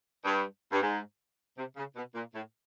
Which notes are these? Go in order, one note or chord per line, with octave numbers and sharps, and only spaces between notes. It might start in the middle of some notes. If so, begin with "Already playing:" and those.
G2
G2
G#2
C3
C#3
B2
A#2
A2